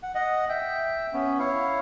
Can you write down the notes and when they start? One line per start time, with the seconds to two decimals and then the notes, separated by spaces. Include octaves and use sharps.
0.03 F#5
0.15 D#5 F#5
0.49 E5 G5
1.13 B3 C#4
1.39 E4 C#5 F5